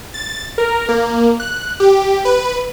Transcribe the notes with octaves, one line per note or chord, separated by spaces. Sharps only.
A6
A#4
A#3
F#6
G4
B4